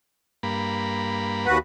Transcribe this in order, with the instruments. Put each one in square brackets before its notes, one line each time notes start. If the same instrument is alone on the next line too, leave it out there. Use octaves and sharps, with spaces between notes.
[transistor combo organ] G2 A#3 B5
[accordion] D#2 F#4 B4